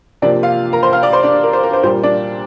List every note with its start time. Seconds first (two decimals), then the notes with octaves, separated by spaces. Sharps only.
0.22 C3 F3 A#3 D4 D5
0.43 F4 F5
0.73 A#4 A#5
0.83 C5 C6
0.93 F5 F6
1.03 D5 D6
1.13 C5 C6
1.23 D4 D5
1.44 A#4
1.53 C5
1.63 A#4
1.73 C5
1.83 A#2 G3 A#3 C5
2.03 D4 D5